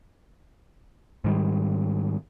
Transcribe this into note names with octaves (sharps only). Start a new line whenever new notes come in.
G#2 D#3 G3